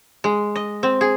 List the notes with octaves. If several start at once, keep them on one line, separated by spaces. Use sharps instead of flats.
G#3
D#5
C4
G#4